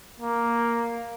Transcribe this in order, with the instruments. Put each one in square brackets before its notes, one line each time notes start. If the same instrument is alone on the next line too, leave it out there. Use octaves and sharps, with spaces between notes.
[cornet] A#3